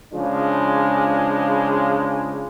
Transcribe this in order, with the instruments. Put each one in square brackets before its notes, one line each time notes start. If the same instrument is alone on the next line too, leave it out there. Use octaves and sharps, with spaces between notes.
[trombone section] C#3 F3 G#3 D4